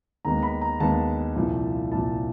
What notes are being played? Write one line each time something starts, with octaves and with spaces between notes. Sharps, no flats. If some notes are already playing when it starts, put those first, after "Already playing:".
D#2 D#3 G#3 B3 A#5
B5
A#5
D#2 D#3 G#3 B3 A5
C2 A#2 F3
C2 A#2 F3 A5